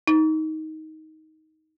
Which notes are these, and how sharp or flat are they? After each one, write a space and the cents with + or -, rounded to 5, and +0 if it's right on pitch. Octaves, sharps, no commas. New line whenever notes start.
D#4 +15